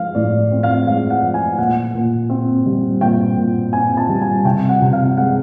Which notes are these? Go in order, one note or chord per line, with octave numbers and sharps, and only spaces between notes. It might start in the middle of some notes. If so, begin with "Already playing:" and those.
Already playing: F3 G#3 F5
A2 D5
C4
F5
G#3 F5
F#5
F3
G#5
A#2 F#5
A#2
C4
G3
A#2 G5
A#2
C4 G#5
A5
G3
G#5
C3 G5
F#5
C3
F5
G#3 F#5